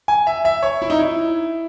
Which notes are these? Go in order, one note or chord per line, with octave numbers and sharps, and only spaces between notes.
G#5
E5
E5
C#5
E4
D#4
E4